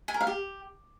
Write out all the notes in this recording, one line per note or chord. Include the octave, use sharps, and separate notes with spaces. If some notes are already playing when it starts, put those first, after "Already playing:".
G#5
A#4
F5
G4